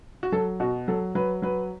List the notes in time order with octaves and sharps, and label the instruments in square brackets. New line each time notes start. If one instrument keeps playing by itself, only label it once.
[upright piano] F#4
F#3 A4
B2 F#4
F#3 A4
F#3 B4
F#3 B4